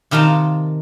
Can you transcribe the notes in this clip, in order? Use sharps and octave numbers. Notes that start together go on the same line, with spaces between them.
C3 D#3 F4 A#4 A5